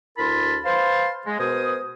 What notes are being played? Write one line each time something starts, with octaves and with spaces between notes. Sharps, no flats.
D2 E4 A#4 A5 B5 C6
B4 C5 F5 A5 C6
G#3
B2 A#4 C5 G#5 D#6